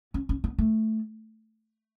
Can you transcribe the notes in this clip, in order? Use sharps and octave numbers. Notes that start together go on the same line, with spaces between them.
C#4
C#4
B3
A3